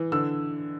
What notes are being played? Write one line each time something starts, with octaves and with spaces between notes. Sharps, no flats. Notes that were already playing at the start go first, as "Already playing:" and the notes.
Already playing: E3
D3 E6